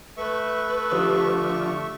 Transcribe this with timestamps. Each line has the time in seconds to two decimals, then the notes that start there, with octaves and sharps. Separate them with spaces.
0.17 A3 B4 E5 C#6
0.92 D3 F3 G4 C5 D#6